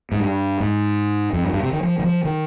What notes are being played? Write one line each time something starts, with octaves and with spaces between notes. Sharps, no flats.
G#2
G2
G#2
F2
G2
G2
C3
D#3
F3
D#3
F3
D#3